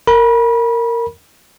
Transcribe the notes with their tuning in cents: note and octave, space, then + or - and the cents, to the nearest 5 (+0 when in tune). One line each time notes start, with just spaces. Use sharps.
A#4 -10 B5 -30